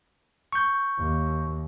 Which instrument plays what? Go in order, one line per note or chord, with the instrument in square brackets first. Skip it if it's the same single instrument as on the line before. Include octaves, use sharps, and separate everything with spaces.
[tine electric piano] C#6 G6
[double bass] D#2